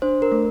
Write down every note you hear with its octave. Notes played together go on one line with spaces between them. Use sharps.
D4 C5
A#4
A3